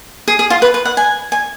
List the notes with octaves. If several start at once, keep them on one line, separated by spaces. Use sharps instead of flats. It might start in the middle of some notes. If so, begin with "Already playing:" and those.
G#4
G#4
F4
B4
B4
F#5
G#5
G#5